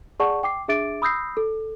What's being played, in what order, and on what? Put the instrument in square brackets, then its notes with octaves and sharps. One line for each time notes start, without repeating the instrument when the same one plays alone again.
[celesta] G#4 D5 F#5 A5 C#6
G5 D6 C7
D4 G#4 E5 D6 A6 D7
B5 D#6 E6 G6 A#6 C7
A4